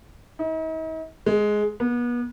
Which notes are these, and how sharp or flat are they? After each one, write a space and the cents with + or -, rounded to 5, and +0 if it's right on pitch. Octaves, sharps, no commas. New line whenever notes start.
D#4 +45
G#3 +10
B3 -35